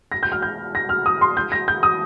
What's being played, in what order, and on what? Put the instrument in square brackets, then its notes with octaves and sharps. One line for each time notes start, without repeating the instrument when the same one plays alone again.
[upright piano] A#6
G6
F6
G6
A#6
F6
D#6
C6
G6
A#6
G6
D#6